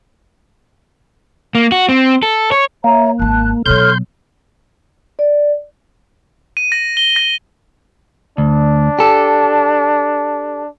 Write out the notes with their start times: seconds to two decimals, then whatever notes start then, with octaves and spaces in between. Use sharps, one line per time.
1.55 A#3
1.72 F#4
1.89 C4
2.23 A4
2.52 C#5
2.84 A#3 C#5 E5 A#5
3.19 G#1 G#2 A5 F#6
3.66 B2 F#3 A4 C#5 C6 F6 G6
5.19 D5
6.57 D#7
6.72 A#6
6.97 G7
7.16 A#6
8.38 D2 D4
8.99 G4 A4